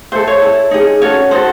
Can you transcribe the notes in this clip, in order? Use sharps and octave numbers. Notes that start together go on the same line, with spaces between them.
E4 A4 C5
C#5
E4 A4
D#4 G#4
C#4 F#4 A4 C#5
D#4 F#4 A4 C5